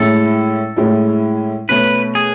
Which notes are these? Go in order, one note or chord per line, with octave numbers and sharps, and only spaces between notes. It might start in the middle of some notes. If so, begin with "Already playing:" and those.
Already playing: A2 G#3 C#4 E4 A4
A2 G#3 C#4 E4
B2 A3 C#4 B4
G#4